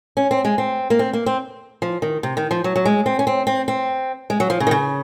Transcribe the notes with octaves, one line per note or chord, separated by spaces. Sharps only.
C#4
C4
G#3
C4
A#3
C4
A#3
C4
F3
D#3
C3
D#3
F3
F#3
F#3
G#3
C4
C#4
C4
C4
C4
G#3
F#3
F3
C#3
D#3
C#3